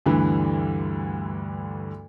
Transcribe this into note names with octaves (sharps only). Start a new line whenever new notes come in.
D2 G2 D3 E3 B5